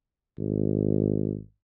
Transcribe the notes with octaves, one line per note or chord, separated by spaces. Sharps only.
G#1